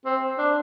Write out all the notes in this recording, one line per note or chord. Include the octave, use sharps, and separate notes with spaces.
C4
D4